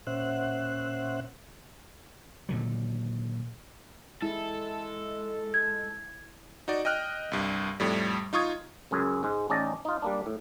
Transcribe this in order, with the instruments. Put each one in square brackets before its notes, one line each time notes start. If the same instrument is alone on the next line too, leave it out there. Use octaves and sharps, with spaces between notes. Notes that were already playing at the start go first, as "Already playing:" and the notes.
[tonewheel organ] A#2 C#4 C5 E5 F#5 F#6
[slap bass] A#2 D3 D#3 F#3
[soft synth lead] G#3 [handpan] E4 [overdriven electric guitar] A4
[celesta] G#6
[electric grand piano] D#4 F#4 D5
D#5 G5 F6 F#6
C2 G2
F2 A2 G3
D#4 F4 C#6 D#6 G#6
[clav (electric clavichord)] C#2 F#2 C#4 G#4
G#2 G#3
A1 C#4 D#4 D5 A5 A#5
D#4 F4
G3 A#3 D4
A2